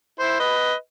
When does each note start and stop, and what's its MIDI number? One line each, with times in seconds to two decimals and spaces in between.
0.20 0.39 64
0.20 0.39 72
0.39 0.73 71
0.39 0.73 75